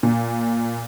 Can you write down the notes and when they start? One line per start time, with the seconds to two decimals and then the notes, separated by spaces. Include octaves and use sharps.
0.03 A#2